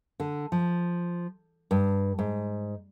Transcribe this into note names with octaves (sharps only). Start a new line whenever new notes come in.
D3
F3
G2
G#2